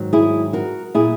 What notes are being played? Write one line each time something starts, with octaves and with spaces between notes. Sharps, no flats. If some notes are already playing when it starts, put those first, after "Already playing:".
Already playing: G#2 D#3 F#3
E4 G#4
F#4 A#4
A#2 F#3 E4 G#4